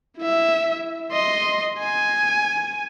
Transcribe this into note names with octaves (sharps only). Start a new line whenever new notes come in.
E4 E5
D#5 C6
G#5